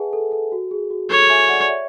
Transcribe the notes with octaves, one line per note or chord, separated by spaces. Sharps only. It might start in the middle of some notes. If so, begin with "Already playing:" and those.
Already playing: G#4 B4 E5 F#5 G#5 A5
A4
A4
F#4
G#4
F#4
A4 C#5
E5 G#5
D5 F#5
D5
C#5 E5